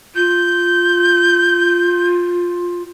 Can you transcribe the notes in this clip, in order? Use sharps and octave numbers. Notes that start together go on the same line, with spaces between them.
F4 G6